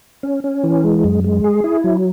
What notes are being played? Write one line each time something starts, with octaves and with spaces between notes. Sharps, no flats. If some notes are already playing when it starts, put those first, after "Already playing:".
C#4
C#4
E3
G#3
F#2
G#3
G#4
E4
F#3